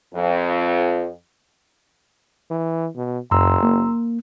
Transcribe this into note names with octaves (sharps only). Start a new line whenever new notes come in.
F2
E3
B2
F#1 F#2 A#5 C6 E6
A#3